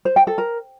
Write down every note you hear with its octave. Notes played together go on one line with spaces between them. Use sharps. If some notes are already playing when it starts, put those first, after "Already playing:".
C5
G5
A4
A#4